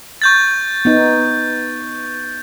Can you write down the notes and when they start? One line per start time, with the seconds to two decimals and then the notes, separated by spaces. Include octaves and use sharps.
0.22 C#6 G6 A6
0.85 B3 D#4